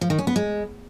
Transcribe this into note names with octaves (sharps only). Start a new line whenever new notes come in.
F3
D#3
C#4
B3
G#3